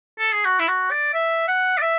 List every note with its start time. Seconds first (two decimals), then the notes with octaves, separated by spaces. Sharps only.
0.19 A4
0.32 G#4
0.45 F#4
0.59 E4
0.68 F#4
0.91 D5
1.14 E5
1.48 F#5
1.78 D5
1.82 E5